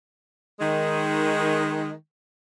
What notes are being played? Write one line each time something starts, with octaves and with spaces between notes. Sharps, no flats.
D#3 G#3